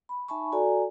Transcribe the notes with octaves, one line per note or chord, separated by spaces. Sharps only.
B5
D#4 E5 G#5 A5 B5 C#6
F#4 A4 D5 G#5 A#5